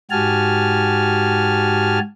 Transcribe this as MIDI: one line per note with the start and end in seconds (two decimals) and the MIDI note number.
0.11 1.99 44
0.11 1.99 66
0.11 1.99 67
0.11 1.99 80
0.11 1.99 81
0.11 1.99 89